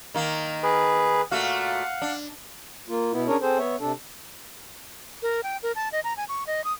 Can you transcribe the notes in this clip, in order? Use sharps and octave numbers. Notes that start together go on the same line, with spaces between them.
D#3 A#3
G#4 B4
A#2 A3 F#4 F5 F#5
D4
A#3 F4
B2 B3 E4
C#4 D4 G#4 A#4 C#5
C4 G#4 A4 C5
B3 C#5 E5
C3 D4 A4
A#4
G5
A#4
A5
D#5
A#5
G#5
C#6
D#5
D#6